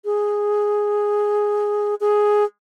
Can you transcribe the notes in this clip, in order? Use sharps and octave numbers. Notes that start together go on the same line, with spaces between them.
G#4
G#4